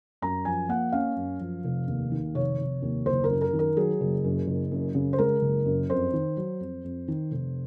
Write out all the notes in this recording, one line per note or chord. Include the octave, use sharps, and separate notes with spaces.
F#2 A#5
F3 G#5
A#3 F#5
C#4 F5
F#2
F3
F1
D#2
D#3
F1 C#5
F1
D#2
F#1 C5
A#4
F#2
A#4
D#3
A#4
F#3 G#4
F#1
F#2
F#1
F#2
C#3
C5
G#3 A#4
F#1
F#2
F2 C5
D#3
F#3
F2
F2
D#3
F1